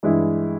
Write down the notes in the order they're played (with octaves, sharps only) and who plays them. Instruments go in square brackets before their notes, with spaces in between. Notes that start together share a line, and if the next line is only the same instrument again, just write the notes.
[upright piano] G2 E3 G#3 E4